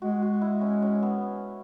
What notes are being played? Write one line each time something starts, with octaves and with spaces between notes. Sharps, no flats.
G#3 F#4
F#4
E4
C#4
C#4
B3